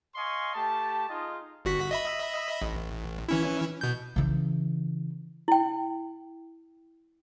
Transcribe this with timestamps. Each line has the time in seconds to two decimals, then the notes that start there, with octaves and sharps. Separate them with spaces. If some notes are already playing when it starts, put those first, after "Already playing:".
0.15 D#5 F5 G#5 C6 C#6
0.54 A3 G4 A5
1.08 D#4 F4 G#4 D#5
1.65 G1 F#4 B6
1.91 D#5 E5 B5
2.62 A1
3.29 E3 C#4 E4
3.81 B2 G6
4.16 C#3 E3
5.48 E4 G5